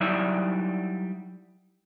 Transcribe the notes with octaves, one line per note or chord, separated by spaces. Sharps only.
F#3 G3 D#4 E4 D5 E5